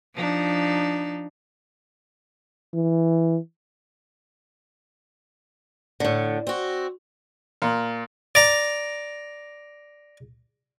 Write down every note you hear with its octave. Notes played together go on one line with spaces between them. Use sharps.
F3 D4 D#4
E3
A2 D3
C4 F#4
A#2
D5 A#5